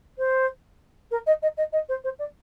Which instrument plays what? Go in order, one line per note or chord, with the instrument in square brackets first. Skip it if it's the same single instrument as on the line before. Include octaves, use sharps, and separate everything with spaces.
[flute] C5
A#4
D#5
D#5
D#5
D#5
C5
C5
D5